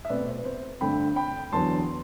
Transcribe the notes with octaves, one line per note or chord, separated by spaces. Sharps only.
E5
B2 A3 C4 B4 D5
C5
B4
C5
G2 D3 A3 C4 G5 B5
G5 B5
E2 D3 F#3 B3 A5 C6